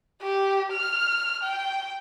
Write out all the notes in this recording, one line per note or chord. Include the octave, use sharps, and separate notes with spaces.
G4
F6
G5